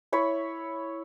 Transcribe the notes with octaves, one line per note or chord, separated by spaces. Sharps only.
E4 C#5 B5